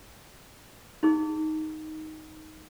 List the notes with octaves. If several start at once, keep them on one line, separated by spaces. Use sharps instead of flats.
D#4 G#4